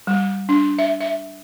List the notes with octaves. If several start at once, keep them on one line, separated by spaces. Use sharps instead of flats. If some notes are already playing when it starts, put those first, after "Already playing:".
G3
D4
E5
E5